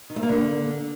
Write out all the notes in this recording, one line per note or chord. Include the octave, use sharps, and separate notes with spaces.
D#3
A3
A#3
D3